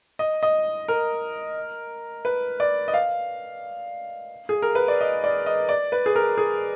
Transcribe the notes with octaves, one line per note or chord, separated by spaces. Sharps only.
D#5
D#5
A#4
B4
D5
D#5
F5
G#4
A#4
B4
D5
D#5
D5
D#5
D5
B4
G#4
A#4
G#4